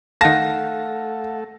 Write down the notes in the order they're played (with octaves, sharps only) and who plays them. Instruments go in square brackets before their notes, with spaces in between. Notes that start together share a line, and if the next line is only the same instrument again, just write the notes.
[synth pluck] D#3 A5 [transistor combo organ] A3 A4 [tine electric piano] F5 F#5 [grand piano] A#6